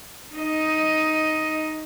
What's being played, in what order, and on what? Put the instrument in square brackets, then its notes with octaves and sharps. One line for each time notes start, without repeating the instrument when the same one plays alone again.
[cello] D#4 D#5